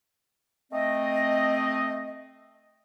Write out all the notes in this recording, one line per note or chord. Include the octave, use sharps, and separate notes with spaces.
A3 C4 D#5